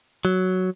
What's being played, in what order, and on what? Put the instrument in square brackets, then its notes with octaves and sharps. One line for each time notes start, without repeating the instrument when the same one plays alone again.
[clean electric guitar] F#3